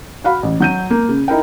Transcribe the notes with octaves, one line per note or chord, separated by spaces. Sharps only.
F#4 F5 B5
A1
F#3 G6 D#7
A#3
C#3
D#4 E4 A#4 G5